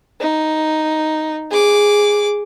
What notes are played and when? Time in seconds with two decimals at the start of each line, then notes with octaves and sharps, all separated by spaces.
0.20 D#4
1.51 G#4 D6